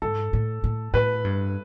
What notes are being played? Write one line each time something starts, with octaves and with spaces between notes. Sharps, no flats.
G#2 A4
A2
A2
A2 B4
G2